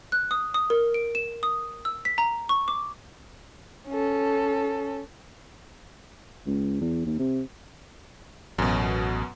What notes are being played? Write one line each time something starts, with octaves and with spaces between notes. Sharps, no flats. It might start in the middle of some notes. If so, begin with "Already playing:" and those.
F#6
D#6
D#6
A#4
D7
E7
D#6
E6
B6
A#5
C#6
D6
C#4 A4
C#2
E2
D#2
C3
A1 F#2 B2